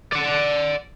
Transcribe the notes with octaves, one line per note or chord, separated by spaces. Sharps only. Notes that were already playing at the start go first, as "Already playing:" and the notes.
D5 F#5